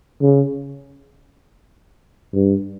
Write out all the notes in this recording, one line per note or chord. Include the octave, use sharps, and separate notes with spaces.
C#3
G2